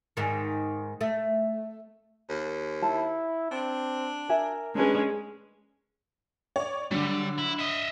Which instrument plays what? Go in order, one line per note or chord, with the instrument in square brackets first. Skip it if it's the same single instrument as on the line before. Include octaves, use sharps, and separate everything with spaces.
[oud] G#2 D#3
A3
[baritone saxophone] D#2
[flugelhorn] E4 [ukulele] A5
[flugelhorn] C4 [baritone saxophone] D4
[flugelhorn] A#4 [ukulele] E5 G#5
[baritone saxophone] D#2 [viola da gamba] G#3 C#4 [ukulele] D4 B4
[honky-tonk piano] C#5 D5
[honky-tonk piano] D3 F#3 [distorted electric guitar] G3
[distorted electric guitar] E4
D#5 E5